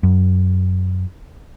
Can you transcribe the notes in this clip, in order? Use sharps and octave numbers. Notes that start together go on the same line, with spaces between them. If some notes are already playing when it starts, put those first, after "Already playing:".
F#2